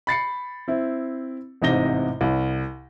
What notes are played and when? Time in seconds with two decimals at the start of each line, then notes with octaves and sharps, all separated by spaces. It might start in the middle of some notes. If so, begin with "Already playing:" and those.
0.07 B5 A6 C7 C#7
0.68 C4 E4
1.62 A1 G#2 C3 D#5 A#6 G7
2.21 C2